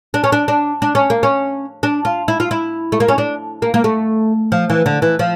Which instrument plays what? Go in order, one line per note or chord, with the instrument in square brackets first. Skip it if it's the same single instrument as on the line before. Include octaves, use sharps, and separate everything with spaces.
[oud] D4
C#4
D4
D4
D4
C#4
A#3
C#4
D4
F4
E4
F4
E4
A3
A#3
C#4
D4
A#3
A#3
A3
F3
E3
D3
E3
F3